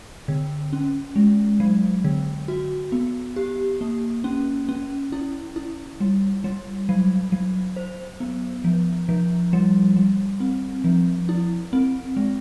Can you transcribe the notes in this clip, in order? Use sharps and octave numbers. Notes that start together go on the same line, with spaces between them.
D3
C#4
G#3
F#3
D3
F#4
B3
G4
A#3
C#4
C#4
E4
E4
G3
G3
F#3
F#3
C5
B3
F3
F3
G3
G3
C4
F3
E4
C4
G#3